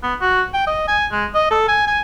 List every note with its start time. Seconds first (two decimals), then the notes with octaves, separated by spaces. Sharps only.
0.03 B3
0.21 F#4
0.53 G5
0.67 D#5
0.87 G#5
1.11 G#3
1.34 D#5
1.51 A4
1.68 G#5
1.87 G#5